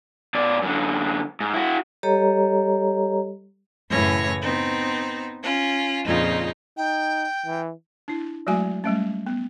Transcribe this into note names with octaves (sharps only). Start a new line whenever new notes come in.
B2 D5
F#2 D3
G#2
E4 F#4
G3 G4 A4 C#5 D#5 A#5
F#2 A2 C#3 E3 C#5 A#6
B3 C4 D#4
C#4 F4
F2 A#2 C#3 D#4 F4
D#4 G5
E3
D4 E4
F#3 G#3 A3 F#4 G#5
G3 A3 C#4
B3